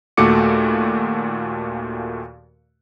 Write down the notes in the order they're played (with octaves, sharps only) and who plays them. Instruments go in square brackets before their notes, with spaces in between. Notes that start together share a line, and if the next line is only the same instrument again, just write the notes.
[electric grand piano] D#2 A#2 A3 F#4 D6 C#7